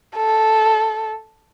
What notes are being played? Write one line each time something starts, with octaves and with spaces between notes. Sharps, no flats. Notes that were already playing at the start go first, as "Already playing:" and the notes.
A4